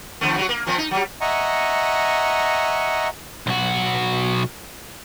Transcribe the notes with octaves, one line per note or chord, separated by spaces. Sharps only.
E2 D3 A3
F#3 A3 F#4
A#3
A#2 F3 C4
D#4
F#3 G3
D#5 E5 F#5 G#5 A#5 C#6
B1 F#4